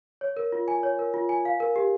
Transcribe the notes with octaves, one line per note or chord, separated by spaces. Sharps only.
C#5
A#4
F4
G#5
C#5
A#4
F4
G#5
F5
A#4
G4